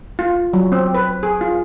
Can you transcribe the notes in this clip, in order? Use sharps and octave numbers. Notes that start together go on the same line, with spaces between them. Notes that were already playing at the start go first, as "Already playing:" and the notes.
F4
F#3
C4
B4
G#4
F4